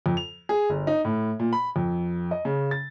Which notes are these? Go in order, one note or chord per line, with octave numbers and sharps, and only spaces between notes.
F2
F7
G#4
G1
D#4
A2
A#2
B5
F2
D#5
C#3
A6